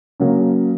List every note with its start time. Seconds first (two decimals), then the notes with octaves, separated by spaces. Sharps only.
0.20 C#3 F#3 A#3